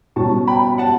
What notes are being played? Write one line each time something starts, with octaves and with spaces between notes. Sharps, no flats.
B2 G3 C#4 A5 C#6
G5 B5
F#5 A5